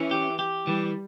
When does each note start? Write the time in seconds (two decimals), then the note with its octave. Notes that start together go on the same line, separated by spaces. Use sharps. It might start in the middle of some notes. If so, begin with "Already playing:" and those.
Already playing: E3 C#4
0.11 G4
0.39 G4
0.67 E3 G3